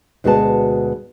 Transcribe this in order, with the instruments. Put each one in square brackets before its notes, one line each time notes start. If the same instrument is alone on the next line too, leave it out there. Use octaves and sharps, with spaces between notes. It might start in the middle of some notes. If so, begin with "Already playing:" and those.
[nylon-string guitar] D2 B2 G#3 F#4 B4 A5